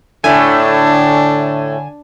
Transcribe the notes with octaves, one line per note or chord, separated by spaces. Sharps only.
A2 D3 A3 D4 G#5